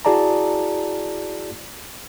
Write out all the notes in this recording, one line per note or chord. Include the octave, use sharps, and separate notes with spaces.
E4 F#4 G#4 D5 A5 A#5